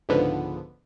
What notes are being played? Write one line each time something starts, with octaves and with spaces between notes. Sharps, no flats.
C#2 G#2 D3 F3 B3